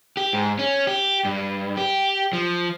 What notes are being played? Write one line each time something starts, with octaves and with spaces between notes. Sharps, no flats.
G4
G#2
C#4
G4
G2
G4
F3